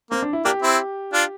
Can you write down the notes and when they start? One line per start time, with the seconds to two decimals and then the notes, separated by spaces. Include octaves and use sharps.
0.11 A#3 C4
0.22 D4
0.33 E4
0.45 A#3 D4 G4
0.62 C4 E4
1.13 D4 F4